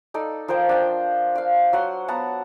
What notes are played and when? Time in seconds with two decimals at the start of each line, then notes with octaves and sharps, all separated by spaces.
0.14 D#4 A4 D5
0.48 F3 A#4 C5 G5
0.69 D4 G5
1.35 D5 F5
1.73 F#3 F#5 C6
2.08 B3 F#5 A5 A#5